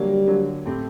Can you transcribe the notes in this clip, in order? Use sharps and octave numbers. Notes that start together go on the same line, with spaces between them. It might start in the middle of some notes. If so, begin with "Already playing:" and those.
Already playing: D3 F#3 G3 A#3
D3 F#3 A#3
A2 A3 C4 G4